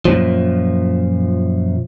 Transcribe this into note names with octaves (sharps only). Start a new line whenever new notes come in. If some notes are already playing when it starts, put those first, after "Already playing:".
F#2 A#2 F3